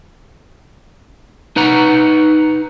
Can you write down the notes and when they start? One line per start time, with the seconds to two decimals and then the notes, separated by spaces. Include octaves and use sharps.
1.56 D#4 B4 F#5 A#5